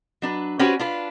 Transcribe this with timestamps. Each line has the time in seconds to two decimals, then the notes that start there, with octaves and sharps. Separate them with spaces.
0.22 F#3 D4 B4
0.59 C#4 F#4 G4 B4 C5 D5
0.79 D4 F4 B4